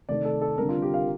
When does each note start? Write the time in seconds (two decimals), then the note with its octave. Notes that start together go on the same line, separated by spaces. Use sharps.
0.09 C3 D#3 A3 D5
0.25 A4
0.41 A4
0.57 D3 G3 C4 A#4
0.69 F4
0.82 G4
0.94 F5